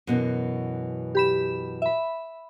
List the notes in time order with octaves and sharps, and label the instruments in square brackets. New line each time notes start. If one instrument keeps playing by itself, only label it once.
[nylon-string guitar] F#2 B2 E3
[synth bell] G4 B5 E7
E5 B5